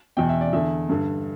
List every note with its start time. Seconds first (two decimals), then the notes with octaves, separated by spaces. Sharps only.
0.17 E2 B2 G5
0.29 E5
0.41 D5
0.53 E2 D3 E5
0.89 G2 D3